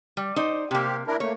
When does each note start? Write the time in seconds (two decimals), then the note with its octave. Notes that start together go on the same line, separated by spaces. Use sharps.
0.17 G3
0.36 D#4 C5 D5
0.71 C3 A#3 C4 G4
1.07 D4 E4 A#4
1.20 A3 A#3 C#5